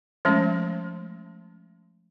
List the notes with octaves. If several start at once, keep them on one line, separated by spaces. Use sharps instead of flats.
F3 G#3 A3 C#4